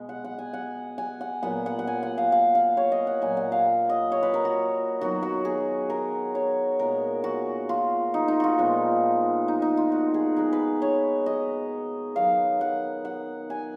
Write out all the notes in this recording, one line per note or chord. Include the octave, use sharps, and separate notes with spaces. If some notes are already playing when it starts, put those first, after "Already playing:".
Already playing: B2 G#3 B3
F#5
F#5
G#5
F#5
G#5
F#5
A#2 F#3 B3 F#5
F#5
F#5
G#5
F#5
F5
F5
F5
C#5
D#5
F#5
A#2 F#3 A#3 G#5
F#5
F5
D#5
C#5
B4
A#4
F#4
D#3 F#3 B3 F#4
F#4
G#4
A#4
C#5
A#2 G#3 B3 A#4
F#4
F4
D#4
D#4
F4 F#4
A#2 F3 G#3 B3
D#4
D#4
F4
F#4
G#4
D#3 G#3 B3 A#4
B4
C#5
D#5
D#3 F#3 B3 F5
F#5
F#5
G#5